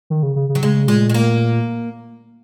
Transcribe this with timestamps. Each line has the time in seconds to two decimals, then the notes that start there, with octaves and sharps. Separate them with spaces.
0.10 D#3
0.23 C#3
0.36 C#3
0.49 C#3
0.55 F#3
0.62 C#3 G#3
0.88 A#2 G#3
1.10 G#3
1.14 A#3